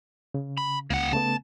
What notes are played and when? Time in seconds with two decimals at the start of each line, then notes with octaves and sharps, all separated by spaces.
0.34 C#3
0.58 B5
0.90 C#2 A#3 F#5
1.13 C#3 A3 B3 A5